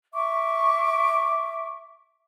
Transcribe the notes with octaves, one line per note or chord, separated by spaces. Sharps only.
E5 C#6 D6